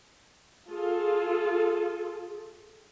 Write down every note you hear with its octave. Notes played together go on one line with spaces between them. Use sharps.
F4 G#4 A4